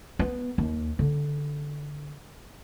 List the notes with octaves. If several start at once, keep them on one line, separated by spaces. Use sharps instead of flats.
B3
D#2
D3